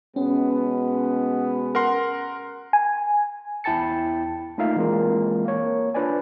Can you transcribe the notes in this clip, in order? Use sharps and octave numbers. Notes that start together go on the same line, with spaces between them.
B2 G#3 B3 C#4
A#4 F#5 C6
G#5
E2 E4 G5 A5 A6 C#7
A3 A#3 D#4 F4 E5 F5
E3 G#3 A#3 C4 F4 A#4
A#3 C#5
D4 F4 B4 C5 D5 G#5